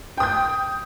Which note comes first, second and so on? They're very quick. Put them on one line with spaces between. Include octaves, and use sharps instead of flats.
G5 D#6 G6